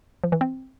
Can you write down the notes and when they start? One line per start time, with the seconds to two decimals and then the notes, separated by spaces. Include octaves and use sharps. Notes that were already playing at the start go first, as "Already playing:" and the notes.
0.24 F3
0.32 E3
0.41 C4